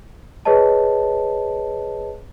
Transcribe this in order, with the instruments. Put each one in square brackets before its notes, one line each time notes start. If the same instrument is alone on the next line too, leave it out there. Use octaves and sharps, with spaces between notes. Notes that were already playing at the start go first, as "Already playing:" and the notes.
[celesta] G#4 B4 C#5 D#5 A5